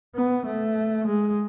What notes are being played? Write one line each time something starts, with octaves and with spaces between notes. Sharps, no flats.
B3
A3
G#3